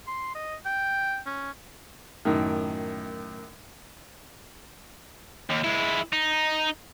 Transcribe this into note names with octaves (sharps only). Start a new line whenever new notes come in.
C6
D#5
G5
C#4
F#2 A2 D#3
D#2
G#3 E4
D#4